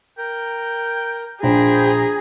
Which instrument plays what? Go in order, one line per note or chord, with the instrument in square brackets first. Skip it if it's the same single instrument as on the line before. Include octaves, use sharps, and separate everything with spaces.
[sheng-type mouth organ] A#4 [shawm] G5
[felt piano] A#1 [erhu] G#4 [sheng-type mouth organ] C5 G5 B5 [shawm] A#5